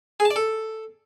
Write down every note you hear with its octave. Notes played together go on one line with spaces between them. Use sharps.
G#4
A5
D5
A4